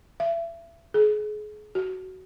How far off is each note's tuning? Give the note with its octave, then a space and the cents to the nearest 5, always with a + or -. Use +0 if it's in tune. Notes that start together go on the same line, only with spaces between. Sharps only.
E5 +30
G#4 +30
F#4 +15